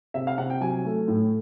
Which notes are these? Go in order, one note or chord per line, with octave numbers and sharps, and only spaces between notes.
C3 E5
F5
C3 F#5
G5
F#3 G#5
A3
A2